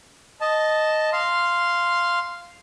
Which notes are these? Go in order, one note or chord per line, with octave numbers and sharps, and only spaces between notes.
D#5 A5
F5 C6